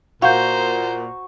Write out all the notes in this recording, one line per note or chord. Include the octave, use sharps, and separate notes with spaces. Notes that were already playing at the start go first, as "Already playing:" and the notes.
A#2 F#4 C5 F5 A#5 G6